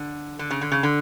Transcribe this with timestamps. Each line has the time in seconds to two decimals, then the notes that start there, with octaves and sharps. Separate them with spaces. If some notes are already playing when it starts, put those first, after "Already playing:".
Already playing: D3
0.39 D3
0.51 C#3
0.61 D3
0.72 C#3
0.83 D3